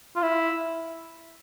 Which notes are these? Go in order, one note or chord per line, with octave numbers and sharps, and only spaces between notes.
F4
E4